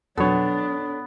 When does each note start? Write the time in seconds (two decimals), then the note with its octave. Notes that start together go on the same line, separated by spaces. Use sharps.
0.17 F2 B2 F#3 B3 D4 A4 C#5